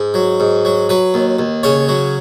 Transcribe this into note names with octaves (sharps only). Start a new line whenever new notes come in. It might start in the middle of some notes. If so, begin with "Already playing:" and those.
Already playing: G#2
F#3
G#2
F#3
F#3 B4
D#2
D#2
C#3 C#5
F#3